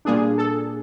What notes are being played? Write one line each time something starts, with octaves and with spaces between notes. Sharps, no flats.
A#2 G3 A#3 D4 G#4
A4